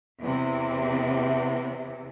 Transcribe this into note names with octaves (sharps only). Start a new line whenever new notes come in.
E2 C3